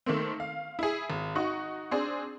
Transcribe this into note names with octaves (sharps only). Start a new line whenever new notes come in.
D#3 A3 A#3 C4
F5
E4 G#4
G#1
D#4 F#4 C#6
C4 D4 G#4